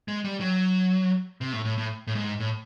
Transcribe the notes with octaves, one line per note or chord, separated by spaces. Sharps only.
G#3
G3
F#3
C3
A2
A2
A2
A2
G#2
A2